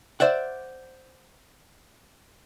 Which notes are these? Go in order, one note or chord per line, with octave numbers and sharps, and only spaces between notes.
C5 D5 E5 F#5